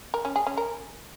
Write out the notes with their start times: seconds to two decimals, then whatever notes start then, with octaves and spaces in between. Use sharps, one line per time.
0.14 A#4
0.25 C#4
0.36 G#4
0.47 C#4
0.57 A#4